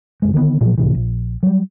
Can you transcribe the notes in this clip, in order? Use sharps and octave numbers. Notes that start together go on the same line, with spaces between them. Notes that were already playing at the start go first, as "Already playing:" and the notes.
F#1 F2 G#3
D3 D#3 A#3 B3
A#2 F3 F#3
C#2 A2 C3 E3
A#1
F#3 G3